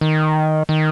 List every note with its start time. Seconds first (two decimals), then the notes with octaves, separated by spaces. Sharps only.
0.01 D#3
0.69 D#3